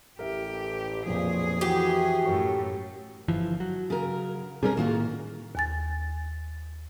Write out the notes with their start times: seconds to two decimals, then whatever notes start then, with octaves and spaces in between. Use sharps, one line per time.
0.19 A1 G4 A#4 E5
1.06 B1 F2 A#2 F3 G#4
1.61 E3 F#4 G4
2.25 F#2 A2 A#4 C#5 C#6
3.28 G1 E3 F3
3.60 F#3
3.90 C#3 A#4
4.63 C3 G3 C#4 G#4 A#4
4.77 A2 D#3 A#3 F4 F#4
5.55 D#2 G#5 A6